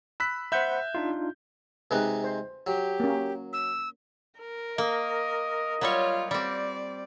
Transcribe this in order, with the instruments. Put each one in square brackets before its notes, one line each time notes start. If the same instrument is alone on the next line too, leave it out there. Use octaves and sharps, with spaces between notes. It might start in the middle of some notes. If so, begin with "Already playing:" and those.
[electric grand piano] B5 F#6 B6 [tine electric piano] E6
[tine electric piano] C5 F#5 B5 [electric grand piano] E5 G6
[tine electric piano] D4 D#4 F4
[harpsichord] C3 G#3 D#4 [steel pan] B4
[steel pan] C5
[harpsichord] F#3 [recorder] G4
[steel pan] A#3 C#4
[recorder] E6
[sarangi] A#4
[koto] A#3 [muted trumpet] D#5
[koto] F#3 G3 C#5 [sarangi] F4
[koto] G3 C4 [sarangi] D5